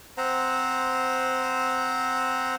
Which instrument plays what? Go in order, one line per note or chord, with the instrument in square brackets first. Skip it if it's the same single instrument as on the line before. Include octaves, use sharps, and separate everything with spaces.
[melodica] C4 C5 F#5 A#5